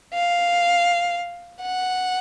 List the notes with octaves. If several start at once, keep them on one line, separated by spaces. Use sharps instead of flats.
F5
F#5